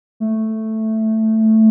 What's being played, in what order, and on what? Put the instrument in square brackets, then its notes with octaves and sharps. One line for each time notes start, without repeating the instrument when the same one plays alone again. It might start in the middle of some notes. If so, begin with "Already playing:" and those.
[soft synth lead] A3